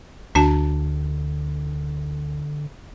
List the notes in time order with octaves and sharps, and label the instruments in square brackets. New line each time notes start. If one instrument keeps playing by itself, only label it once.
[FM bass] D2 [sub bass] D3 [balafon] D4 F#4 A5